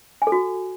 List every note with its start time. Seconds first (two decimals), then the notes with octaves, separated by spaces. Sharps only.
0.22 G#5
0.27 A4
0.32 F#4